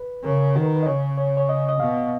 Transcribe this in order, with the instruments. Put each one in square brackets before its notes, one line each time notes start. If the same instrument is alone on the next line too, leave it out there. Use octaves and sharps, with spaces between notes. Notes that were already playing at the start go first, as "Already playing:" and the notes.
Already playing: [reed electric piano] B4
[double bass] C#3 [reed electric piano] A#4
[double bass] D#3 [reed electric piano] F#4
[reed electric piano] B4
A#4
B4
D#5
[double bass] C#3 [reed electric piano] C#5
[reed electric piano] C#5
C#5
D#5
D#5
[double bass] B2 [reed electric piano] F5